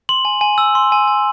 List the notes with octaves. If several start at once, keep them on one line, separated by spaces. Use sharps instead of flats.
C6 F#7
G#5
G#5
E6
C6
G#5
G#5